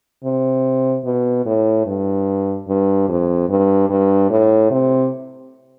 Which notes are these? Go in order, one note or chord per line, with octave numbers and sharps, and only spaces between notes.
C3
B2
A2
G2
G2
F2
G2
G2
A2
C3